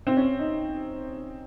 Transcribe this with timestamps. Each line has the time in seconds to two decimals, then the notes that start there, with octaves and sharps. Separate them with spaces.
0.07 C4
0.17 C#4
0.39 D#4